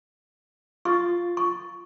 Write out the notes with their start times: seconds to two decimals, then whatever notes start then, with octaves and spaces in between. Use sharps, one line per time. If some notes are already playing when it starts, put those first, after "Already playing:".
0.85 F4 C#6 A6
1.37 C#6